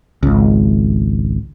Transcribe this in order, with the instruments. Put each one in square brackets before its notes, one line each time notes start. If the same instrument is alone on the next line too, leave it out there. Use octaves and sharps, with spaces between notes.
[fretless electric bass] G#1 C#2